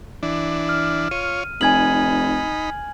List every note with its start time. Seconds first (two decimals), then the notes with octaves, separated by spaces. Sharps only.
0.23 E3 D4
0.69 F6
1.11 F4 C#5 D#7
1.61 F1 D#4 G#5 B5 G#6 F#7